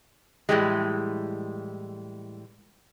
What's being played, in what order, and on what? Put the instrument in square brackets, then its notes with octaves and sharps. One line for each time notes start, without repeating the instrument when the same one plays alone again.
[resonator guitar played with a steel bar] A2 E3 G3 G#3